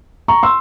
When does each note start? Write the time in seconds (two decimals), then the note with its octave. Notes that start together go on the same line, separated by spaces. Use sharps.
0.28 A#5 C#6
0.43 C6 E6